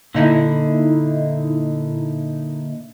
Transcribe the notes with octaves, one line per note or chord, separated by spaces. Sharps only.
A#2 D3 D#4 E4